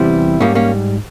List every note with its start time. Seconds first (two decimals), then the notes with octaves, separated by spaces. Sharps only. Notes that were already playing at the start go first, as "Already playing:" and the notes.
Already playing: E2 C3 E3 G3 C4 E4
0.40 G#2 G3 A#3 C#4
0.55 A#3 C#4